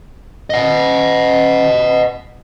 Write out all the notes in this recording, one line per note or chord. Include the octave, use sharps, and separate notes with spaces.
D#5 F#5